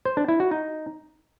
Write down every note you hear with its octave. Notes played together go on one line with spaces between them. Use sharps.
C5
D4
E4
F#4
D#4